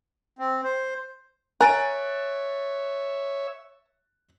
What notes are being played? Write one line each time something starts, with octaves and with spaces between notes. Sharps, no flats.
C4
C5
A#4 C#5 E5 G#5 F#6 A6 D7